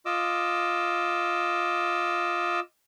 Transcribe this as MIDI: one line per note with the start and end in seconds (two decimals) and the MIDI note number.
0.06 2.60 65
0.06 2.60 75
0.06 2.60 86
0.06 2.60 88